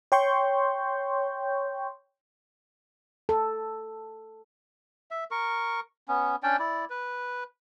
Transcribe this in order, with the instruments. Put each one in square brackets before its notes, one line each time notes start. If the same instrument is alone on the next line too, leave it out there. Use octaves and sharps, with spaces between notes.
[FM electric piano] C#5 G5 C6 C#6 G6
[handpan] A4
[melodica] E5
A#4 C#6
B3 C#4
C#4 D4 D5 G5
E4 D5
B4